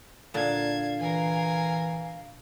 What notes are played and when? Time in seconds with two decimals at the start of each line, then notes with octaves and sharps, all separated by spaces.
0.34 A#2 D3 F5 A5 G#6
0.98 E3 A#4 G#5